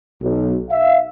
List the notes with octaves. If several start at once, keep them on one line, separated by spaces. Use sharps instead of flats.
B1
E5 F5